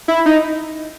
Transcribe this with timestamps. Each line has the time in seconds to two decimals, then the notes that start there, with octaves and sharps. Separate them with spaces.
0.08 E4
0.26 D#4